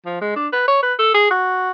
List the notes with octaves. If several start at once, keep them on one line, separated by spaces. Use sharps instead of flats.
F3
G#3
D4
B4
C#5
B4
A4
G#4
F#4